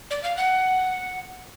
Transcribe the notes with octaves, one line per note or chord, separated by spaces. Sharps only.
D5
F5
F#5